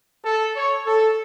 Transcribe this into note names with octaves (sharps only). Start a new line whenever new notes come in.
A4
C#5
A4